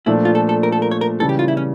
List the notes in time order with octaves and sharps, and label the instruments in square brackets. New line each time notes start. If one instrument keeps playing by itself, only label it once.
[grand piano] A#2 F3 A3 D4 [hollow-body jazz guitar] E4
[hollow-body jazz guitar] F4
A4
A4
A#4
A4
A#4
C#5
A#4
[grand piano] C#3 E3 G3 [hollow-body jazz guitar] A4
[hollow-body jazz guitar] G4
F4
E4
C#4